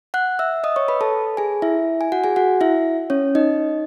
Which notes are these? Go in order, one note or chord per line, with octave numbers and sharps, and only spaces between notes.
F#5 F#6
E5 E6
D#5 D#6
C#5 C#6
B4 B5
A4 A5
G#4 G#5
E4 E5
G#5
F#4 F#5
G#4 G#5
F#4 F#5
E4 E5
C#4 C#5
D#4 D#5